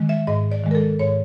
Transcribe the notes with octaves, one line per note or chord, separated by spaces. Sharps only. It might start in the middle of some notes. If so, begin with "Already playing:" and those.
Already playing: D#3 G#3
E5
G#2 D#5
D5
D#3 G#3
A#4
A4
G#2 C#5